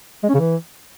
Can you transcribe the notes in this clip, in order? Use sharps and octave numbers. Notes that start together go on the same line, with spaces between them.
G#3
C#4
C#3
E3